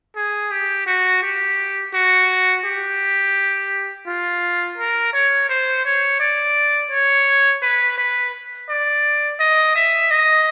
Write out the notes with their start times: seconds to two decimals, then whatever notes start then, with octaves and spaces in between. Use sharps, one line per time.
0.16 G#4
0.51 G4
0.87 F#4
1.22 G4
1.94 F#4
2.65 G4
4.07 F4
4.78 A#4
5.13 C#5
5.49 C5
5.85 C#5
6.20 D5
6.91 C#5
7.62 B4
7.98 B4
8.69 D5
9.39 D#5
9.76 E5
10.11 D#5